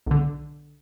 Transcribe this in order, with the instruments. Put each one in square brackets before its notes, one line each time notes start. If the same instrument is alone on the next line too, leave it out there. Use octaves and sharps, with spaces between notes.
[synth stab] B1 D3